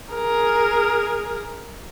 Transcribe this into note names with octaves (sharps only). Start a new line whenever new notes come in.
G#4 A#4